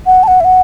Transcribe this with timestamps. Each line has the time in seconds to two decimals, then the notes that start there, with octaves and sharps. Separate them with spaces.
0.06 F#5
0.23 A5
0.28 F#5
0.40 E5
0.45 F#5